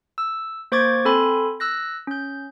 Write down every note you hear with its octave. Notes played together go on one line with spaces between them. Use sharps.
E6
A#3 C5 C#6 D6 G#6 A6
C4 A4 G#5 B5 C6
E6 F#6 A#6
C#4 G6